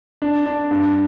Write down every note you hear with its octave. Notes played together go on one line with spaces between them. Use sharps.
D4
D4
G2